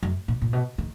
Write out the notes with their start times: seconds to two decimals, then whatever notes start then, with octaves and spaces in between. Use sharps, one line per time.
0.03 F#2
0.28 A#2
0.42 A#2
0.53 B2
0.78 D#3